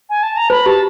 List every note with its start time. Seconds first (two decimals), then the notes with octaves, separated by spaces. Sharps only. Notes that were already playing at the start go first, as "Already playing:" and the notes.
0.09 G#5
0.23 A5
0.36 A#5
0.50 B4 B5
0.66 G4 A5